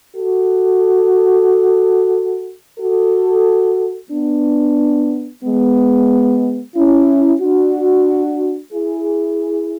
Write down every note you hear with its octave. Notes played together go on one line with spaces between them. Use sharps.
F#4 A4
F#4 A4
B3 D4
G#3 B3
C#4 E4
D4 F#4
E4 G#4